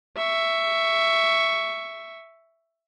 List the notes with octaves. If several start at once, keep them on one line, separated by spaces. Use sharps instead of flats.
E5 C#6